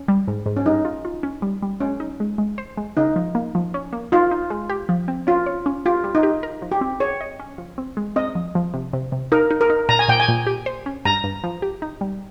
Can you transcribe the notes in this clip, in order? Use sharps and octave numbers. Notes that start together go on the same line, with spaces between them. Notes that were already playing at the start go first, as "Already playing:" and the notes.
Already playing: C#4
G3
G#2
G#2
C#4
G2 D#4
F4
F4
C#4
G3
G3
G#3 C#4
D#4
G#3
G#3
C5
G#3
C#3 D#4
F3
A#3
F3
C#4
A#3
D#4 F4
D#4
G#3
G4
F3
C4
C#4 F4
C#5
C#4
F4 G4
G3
D#4
G4
A#4
F3
G4
C4
G#4 C#5
D#5
C#4
F3
C4
G#3
C4 D#5
F3
F3
C3
C3
C3
D#4 A#4
D#4
A#4
D#4
A#2 A#5
G#5
A#2 G5
G#5
A#2
G4
C5
C#4
G2 A#5
G2
F3
G4
D#4
G3